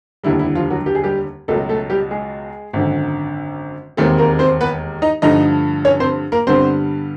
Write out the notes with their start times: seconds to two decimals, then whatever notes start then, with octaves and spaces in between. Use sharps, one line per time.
0.24 F1 D#2 D3 G3 E4
0.39 E4
0.55 F3 F4
0.70 F#3 F#4
0.86 G4
0.95 G#4
1.04 G3 G4
1.48 C#2 B2 F#3 A3 A4
1.69 A3 A4
1.90 G3 G4
2.11 G#3 G#4
2.73 G#1 F#2 D3
3.97 E1 D#2 D#3 G#3 A3 C4 A4
4.18 A#3 A#4
4.39 C4 C5
4.61 B3 B4
5.02 D#4 D#5
5.22 G2 D3 F3 A3 D#4 D#5
5.85 C#4 C#5
6.00 C4 C5
6.32 A#3 A#4
6.47 G2 D3 G3 B3 C4 C5